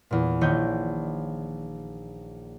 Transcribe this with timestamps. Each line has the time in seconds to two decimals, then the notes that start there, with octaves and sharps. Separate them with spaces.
0.11 E2 A#2
0.41 A#1 D#3 C#5 D#5 G6